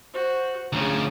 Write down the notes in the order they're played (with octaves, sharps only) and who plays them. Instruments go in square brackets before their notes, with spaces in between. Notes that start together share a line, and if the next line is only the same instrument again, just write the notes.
[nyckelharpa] F#4 [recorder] C5
[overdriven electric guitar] D2 F3 [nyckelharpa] C#4 G#4 [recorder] A#5